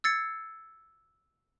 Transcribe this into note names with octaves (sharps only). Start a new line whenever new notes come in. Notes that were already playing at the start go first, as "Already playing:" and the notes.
E6 G#6 A6 C7 C#7